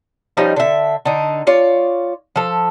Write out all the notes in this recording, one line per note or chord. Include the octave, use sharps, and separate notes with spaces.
F3 G3 C#4 D#4
D3 E5
D3 D#4
F4 C#5 D5
F3 A4